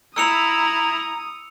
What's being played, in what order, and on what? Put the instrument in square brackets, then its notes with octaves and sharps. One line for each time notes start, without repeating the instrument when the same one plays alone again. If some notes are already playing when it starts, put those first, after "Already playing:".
[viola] E4 [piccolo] A#5 [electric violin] D#6 [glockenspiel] E6 C#7 F7